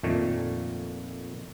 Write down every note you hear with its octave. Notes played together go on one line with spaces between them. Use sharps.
F2 A#2 D#3 A3